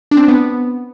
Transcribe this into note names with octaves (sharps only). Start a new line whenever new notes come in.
D4
C4
D4
B3